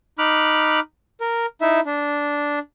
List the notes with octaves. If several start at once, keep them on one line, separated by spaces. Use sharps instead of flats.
D#4 B5 D6 F6 F#6
A#4
D#4 E4 E5
D4